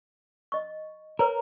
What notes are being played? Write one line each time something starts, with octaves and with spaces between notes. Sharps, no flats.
D#5 C#6
A#4 B4 C#5 A#5